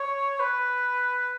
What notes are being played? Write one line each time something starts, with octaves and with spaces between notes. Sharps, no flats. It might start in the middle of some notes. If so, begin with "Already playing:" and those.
Already playing: C#5
B4